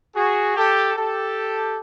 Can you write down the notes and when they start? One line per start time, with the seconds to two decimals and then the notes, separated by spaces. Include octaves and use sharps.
0.16 F#4 G#4
0.56 G4 A4
0.96 G4 A4